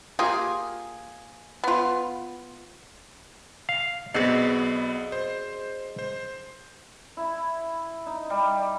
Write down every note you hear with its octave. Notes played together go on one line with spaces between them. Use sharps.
A#3 F4 G4 G#4
B3 F4
F5
B1 B3 C4 D4 F#4 G#4 D#5 C7
C5
C5
E4
D#4
G3